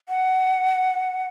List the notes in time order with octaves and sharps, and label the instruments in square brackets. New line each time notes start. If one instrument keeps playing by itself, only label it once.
[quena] F#5